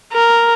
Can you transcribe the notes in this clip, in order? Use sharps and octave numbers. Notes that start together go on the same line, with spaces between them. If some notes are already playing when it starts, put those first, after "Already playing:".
A#4